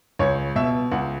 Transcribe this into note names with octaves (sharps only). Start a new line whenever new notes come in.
C#2 C#5
B2 E5
C#2 F#5